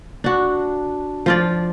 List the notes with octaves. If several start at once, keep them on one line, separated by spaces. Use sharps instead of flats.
D4 F#4
F3 F4 D5